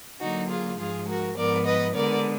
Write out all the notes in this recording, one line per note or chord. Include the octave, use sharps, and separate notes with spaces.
D3 F#3 A#3 D#4 F#4
F4 G#4
G#2 F3 G#3 F4 G#4
F#4 A#4
G#2 F3 B3 A#4 D5
B4 D#5
D3 G#3 B3 A#4 D5